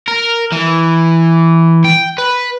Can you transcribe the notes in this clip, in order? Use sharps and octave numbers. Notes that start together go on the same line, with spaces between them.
A#4
E3
G5
B4